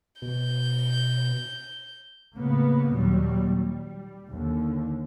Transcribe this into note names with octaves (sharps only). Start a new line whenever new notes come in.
B2 G6
A2 C#3 A#3 B3
D#2 A#2 F#3 G3
G3
D#2 D3